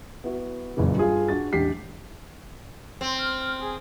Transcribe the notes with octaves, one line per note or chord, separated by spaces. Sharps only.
B3 E4 F#4
F#1 A#2 C#3 E3
G2 F4 G#4 F5
D4 F#4 A6
E1 A1 D4 G4 B6 C7
C4
F6
G#4